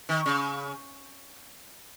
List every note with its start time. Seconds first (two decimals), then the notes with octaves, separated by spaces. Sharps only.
0.09 D#3
0.26 C#3